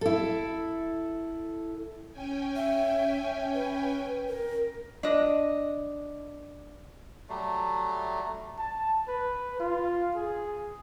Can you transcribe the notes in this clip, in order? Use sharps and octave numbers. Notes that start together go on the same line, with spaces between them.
E4 A4
C#4 G5 G#5
E5
B4
A#4
D4 D#5
F#3 G3 A3
A5
B4
F4
G#4